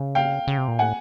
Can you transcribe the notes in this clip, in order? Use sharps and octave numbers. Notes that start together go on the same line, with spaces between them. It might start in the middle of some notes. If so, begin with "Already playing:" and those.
Already playing: C#3
F5 G5
C#3
C3
A#2
A2 F#5 G#5